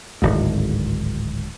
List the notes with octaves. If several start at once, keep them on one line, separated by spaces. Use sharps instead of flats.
D1 G#1 G#2